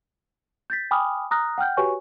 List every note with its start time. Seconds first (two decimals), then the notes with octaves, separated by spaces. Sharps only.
0.70 G6 A6 B6
0.91 G5 G#5 B5 D6 D#6 F6
1.31 A#5 D#6 F6 F#6 A#6
1.58 F#5 G5 F6 G6
1.77 F#4 G4 B4 C#5 G#5 C#6